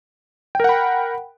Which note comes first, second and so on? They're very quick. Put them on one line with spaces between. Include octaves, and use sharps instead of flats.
G5 A#4 F#5 B5